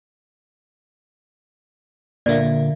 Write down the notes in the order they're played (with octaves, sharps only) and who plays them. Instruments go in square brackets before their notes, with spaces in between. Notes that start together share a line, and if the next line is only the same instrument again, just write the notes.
[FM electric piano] A#2 D3 A#3 [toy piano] D5 E5